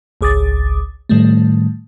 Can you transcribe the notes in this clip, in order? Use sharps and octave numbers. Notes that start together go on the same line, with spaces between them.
G#1 C#2 G#4 D6 D#6 A6
A2 D#3 G3 A3